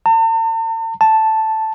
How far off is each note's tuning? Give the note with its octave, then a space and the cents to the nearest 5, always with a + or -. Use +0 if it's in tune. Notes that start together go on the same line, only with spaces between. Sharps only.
A5 +45
A5 +0